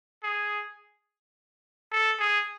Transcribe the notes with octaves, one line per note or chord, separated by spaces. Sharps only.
G#4
A4
G#4